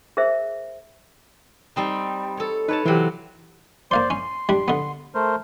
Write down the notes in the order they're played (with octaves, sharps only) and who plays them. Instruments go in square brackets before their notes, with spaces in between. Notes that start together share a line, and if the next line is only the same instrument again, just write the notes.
[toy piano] G#4 A#4 C5 E5
[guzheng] G3 C4 D#4
A4 C#5
[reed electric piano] D#4 A4 [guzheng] B4 C#5 A5
[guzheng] C3 F#3 [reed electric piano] E3 G4
[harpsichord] A#3 F5 C6 [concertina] C5 D5
[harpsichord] C#4 [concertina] C6
[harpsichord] G3 D4
D3 B3
[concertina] A3 A#4 C5